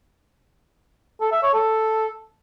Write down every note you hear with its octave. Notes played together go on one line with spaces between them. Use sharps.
A4
E5
C#5
A4